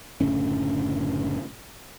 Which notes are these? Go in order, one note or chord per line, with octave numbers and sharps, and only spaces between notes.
F#1 A2 D3 C#4